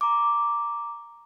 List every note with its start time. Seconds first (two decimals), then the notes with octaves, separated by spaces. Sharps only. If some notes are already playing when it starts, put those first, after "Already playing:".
0.01 A#5 D6